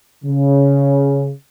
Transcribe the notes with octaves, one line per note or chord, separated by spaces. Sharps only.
C#3